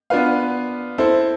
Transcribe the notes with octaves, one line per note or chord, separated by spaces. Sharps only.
B3 D4 F4 B4 F5
C4 E4 A4 C5